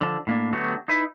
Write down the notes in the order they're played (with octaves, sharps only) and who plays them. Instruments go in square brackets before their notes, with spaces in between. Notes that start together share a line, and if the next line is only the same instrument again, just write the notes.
[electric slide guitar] D3 F3 A5
A2 A#3 D4
D3 F#3 A3 B3 F#4 G4
D#4 E4 B4